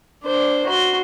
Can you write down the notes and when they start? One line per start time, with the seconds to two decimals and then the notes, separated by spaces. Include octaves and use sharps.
0.23 D4 C5
0.66 F#4 C6